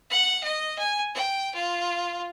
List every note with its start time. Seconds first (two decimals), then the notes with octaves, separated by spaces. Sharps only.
0.10 F#5
0.43 D#5
0.78 G#5
1.14 G5
1.55 F4